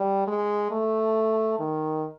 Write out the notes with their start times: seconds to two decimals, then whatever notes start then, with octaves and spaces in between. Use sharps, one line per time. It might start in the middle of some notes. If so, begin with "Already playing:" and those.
Already playing: G3
0.27 G#3
0.71 A3
1.59 D#3